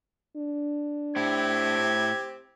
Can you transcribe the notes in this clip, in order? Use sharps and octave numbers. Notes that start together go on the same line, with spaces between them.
D4
A2 C4 E4 G4 G#6